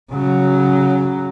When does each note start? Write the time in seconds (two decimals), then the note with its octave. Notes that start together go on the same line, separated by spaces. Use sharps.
0.11 C#3 F#3